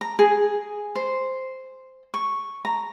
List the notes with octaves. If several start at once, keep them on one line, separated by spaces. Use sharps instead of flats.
A#5
G#4
C5
C#6
A#5